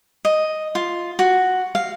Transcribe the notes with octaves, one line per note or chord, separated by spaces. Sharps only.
D#5
F4
F#4
F5